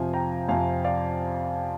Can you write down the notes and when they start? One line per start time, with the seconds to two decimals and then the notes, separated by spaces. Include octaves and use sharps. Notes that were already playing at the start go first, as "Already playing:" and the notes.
Already playing: F2 C3 F3 F5 G#5
0.14 G5 A#5
0.48 F2 C3 F3 F5 G#5
0.84 D5 F5